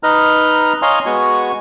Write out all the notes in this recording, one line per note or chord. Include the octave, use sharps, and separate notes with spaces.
D#4 B4 D#5 A#5 F6
C#5 D#5 F5 G#5 A#5 C6
G#3 B3 F#4 G#5 C#6